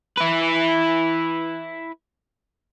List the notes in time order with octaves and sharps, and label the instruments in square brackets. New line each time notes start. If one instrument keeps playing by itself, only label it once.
[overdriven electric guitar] E4 B4